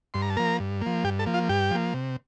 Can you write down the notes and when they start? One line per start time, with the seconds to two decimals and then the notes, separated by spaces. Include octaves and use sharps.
0.14 G2 C6
0.22 A#5
0.30 A5
0.37 F3 A#3 A#4 A#5
0.60 G2
0.81 F3 A#3
1.04 G2 G4 G5
1.19 A4 A5
1.26 F3 A#3
1.34 F4 F5
1.49 G2 G4 G5
1.71 F3 A#3
1.94 C3